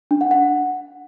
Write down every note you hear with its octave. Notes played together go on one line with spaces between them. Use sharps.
D4
F#5
F#5